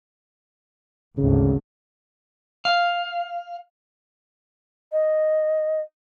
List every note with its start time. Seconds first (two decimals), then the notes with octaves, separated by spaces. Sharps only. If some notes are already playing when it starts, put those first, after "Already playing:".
1.18 G#1 D2 C#3
2.65 F5
4.92 D#5